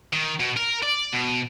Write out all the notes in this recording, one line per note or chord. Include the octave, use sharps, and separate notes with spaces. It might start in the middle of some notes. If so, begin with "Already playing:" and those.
D#3
B2
A#4
D5
B2